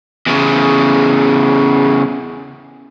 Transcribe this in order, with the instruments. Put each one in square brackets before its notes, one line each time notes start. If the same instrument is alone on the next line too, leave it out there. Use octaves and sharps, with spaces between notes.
[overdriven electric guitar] E2 C#3